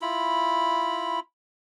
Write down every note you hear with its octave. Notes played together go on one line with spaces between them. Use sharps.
E4 F4 B5